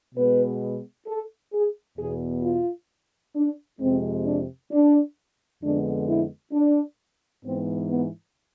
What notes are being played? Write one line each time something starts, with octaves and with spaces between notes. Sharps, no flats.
B2 G#3 B3 B4
A4
G#4
E2 B2 B3 G#4
F4
D4
F2 C3 G#3 C4
D4
D4
F2 D3 G#3 B3 D4
E4
D4
G#2 E3 B3 C4
B3